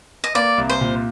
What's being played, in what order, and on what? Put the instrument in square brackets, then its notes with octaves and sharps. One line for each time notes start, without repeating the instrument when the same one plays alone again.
[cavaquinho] D#5
[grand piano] A#3 [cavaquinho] D5
[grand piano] C2
[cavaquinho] C5
[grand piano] A#2